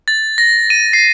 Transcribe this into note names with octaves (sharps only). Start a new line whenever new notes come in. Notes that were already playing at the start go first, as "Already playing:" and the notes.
A6
A#6
D#7
C7